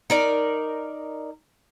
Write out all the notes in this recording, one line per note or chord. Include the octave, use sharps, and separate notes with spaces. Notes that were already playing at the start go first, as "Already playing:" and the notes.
D#4 A#4 D5